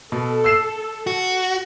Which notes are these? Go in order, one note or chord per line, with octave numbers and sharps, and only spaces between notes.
B2 A4
E6 C7 E7
F#4